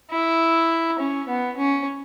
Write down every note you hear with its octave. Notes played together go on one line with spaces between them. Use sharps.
E4
C#4
B3
C#4